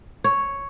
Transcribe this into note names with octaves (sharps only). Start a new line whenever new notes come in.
C#5